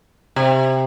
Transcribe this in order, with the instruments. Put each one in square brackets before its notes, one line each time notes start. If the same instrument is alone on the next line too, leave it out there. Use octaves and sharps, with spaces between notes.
[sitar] C3